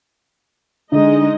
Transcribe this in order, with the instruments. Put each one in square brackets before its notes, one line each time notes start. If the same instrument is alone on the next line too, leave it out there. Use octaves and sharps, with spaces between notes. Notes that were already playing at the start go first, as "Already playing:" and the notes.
[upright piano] D3 [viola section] G#3 D#4 D#5